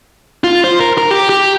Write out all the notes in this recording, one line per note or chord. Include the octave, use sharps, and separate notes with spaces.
F4
C5
A#4
A#4
G4
G4